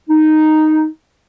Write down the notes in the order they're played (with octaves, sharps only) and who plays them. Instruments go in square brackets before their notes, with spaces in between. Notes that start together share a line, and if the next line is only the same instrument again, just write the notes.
[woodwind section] D#4